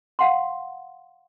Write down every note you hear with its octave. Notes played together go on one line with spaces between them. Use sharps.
F5 F#5 C6